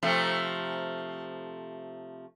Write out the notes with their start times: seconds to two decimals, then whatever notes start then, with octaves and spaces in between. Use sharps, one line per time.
0.03 C3 F3 A3